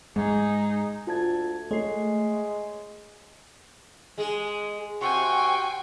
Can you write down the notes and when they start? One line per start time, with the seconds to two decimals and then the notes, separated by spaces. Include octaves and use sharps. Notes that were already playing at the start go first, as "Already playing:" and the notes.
0.16 G#2 G#3 D#4 G#4
1.07 D2 F4 A5 G#6
1.71 G#3 A3 C#5 C7
4.18 G#3 G#4
5.01 C3 F#4 G5 G#5 C6 C#6